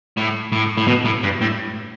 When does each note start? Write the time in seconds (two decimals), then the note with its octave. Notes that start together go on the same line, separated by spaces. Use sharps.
0.17 A2
0.52 A2
0.77 A2
0.87 B2
1.05 A2
1.23 G2
1.41 A2